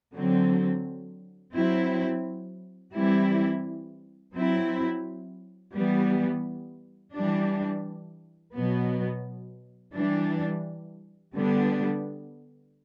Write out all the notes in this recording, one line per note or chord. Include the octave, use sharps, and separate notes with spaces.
D3 F#3 C4
F#3 C4 E4
E3 G3 C4 E4
F#3 C4 E4
E3 G3 B3
E3 G3 D4
B2 F#3 B3
E3 G3 D4
D3 G3 B3 D4